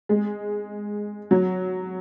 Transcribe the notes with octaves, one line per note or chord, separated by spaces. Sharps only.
G#3
F#3